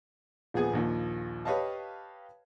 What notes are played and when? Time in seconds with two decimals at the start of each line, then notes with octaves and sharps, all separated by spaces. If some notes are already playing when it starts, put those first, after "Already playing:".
0.54 D#1 F3 B3 G#4 G#5
0.73 A#1 D#2 F3
1.45 G4 B4 C#5 D#5 F5 A5